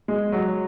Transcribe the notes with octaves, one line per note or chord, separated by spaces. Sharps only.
G#3
F#3